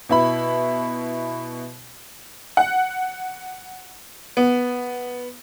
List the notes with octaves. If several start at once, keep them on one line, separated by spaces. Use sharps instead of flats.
B2 E4 B5
F#5
B3